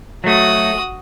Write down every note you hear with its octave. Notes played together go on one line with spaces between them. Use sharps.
F#3 A3 F#4 D#6